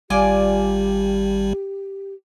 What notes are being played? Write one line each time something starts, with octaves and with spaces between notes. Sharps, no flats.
G#1 G3 F4 G4 D5 G#5